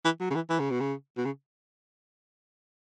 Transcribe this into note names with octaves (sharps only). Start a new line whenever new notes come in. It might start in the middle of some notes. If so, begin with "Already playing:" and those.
E3
F#3
C#3
E3
E3
C#3
B2
C#3
B2
C#3